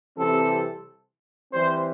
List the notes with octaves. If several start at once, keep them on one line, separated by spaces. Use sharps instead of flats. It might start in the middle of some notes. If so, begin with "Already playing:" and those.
C3 E3 G3 C4 A4
E3 G3 C4 C5